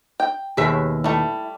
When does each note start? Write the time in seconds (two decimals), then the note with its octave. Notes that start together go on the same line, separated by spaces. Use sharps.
0.20 G5
0.57 D#2 B2 G#4 E5
1.04 G3 A3 E4